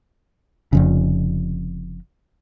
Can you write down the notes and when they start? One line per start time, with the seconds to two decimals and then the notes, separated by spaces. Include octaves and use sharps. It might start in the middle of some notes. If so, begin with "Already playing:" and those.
0.73 F1 F2 C#3